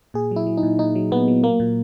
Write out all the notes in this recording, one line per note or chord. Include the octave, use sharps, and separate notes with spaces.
A#2 G#4
F#3 E4
F#3
D#4
A#2
A#2 D#4
F#3
A#2 B3
F#3
F#3 A#3
A#2